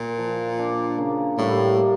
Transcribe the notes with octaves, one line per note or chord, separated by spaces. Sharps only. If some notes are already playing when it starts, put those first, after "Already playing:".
Already playing: A#2
F3
D4
C#3 A#3
A2 G3
A#3